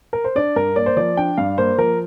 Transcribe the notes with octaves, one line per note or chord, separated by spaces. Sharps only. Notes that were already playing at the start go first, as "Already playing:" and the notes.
A#4
C5
D4 D5
G2 A#4
A#3 D5
C5
F3 D5
D4 G5
G2 F5
A#3 C5
F3 A#4